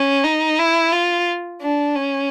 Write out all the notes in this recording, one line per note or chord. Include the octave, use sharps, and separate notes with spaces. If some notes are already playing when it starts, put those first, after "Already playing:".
Already playing: C#4
D#4
E4
F4
D4
C#4